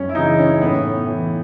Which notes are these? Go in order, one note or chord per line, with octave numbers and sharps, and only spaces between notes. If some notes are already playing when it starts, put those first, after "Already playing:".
Already playing: F#2 C#4
E4
C#3 E3 D#4
C#4
A2 B3
E3